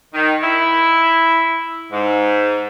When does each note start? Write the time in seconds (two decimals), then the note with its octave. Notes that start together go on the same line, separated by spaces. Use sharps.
0.14 D#3
0.43 E4
1.91 G#2